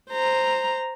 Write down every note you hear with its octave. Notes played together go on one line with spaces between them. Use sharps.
C5 A#5